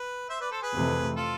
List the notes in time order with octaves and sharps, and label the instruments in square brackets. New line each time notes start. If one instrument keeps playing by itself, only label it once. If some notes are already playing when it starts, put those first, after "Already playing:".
Already playing: [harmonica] B4
C5 E5
B4 D5
A4 C5
G#4 B4
[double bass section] F2 C3 E3 A3 C4
[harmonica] F4 A4